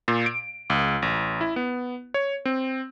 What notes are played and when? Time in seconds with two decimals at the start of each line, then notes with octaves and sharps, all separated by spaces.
0.08 A#2
0.26 D7
0.70 C#2
1.02 A1
1.41 E4
1.56 B3
2.14 C#5
2.45 C4